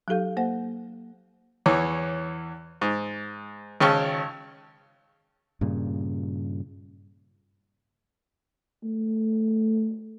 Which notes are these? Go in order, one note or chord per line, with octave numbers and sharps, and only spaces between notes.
F#3 D#4 G4 A4 F5 G6
A#3 C5 F#5
E2 E3 C#5 D6
G#2
G#1 C#3 C#4 G5 A5 C#6
G2 A#2 C#3
A3